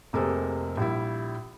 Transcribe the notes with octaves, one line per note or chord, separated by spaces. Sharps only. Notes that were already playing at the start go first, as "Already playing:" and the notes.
F1 C3 A#3 G#4 A4 C5
A#1 G3 E4